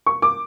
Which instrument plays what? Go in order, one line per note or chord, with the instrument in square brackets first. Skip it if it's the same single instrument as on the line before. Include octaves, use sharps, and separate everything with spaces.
[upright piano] C#6
D6